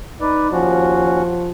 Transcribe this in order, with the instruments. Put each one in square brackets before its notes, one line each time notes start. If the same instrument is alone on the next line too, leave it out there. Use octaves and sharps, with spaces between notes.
[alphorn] D#4 [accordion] B4 D5
[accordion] D#2 C#4 F#4 [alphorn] F3